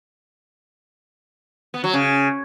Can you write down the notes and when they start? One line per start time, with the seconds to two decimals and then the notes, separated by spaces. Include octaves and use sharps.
1.74 B3
1.84 F#3
1.94 C#3